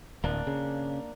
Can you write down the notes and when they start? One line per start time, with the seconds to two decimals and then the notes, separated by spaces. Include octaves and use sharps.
0.24 D1 A#3 D4
0.47 C#3